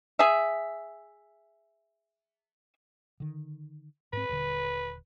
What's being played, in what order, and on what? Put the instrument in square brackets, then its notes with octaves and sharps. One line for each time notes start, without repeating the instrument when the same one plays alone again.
[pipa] G#4 E5
[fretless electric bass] D3 D#3
[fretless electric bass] G#2 C4 [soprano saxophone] B4
[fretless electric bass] D#1 D3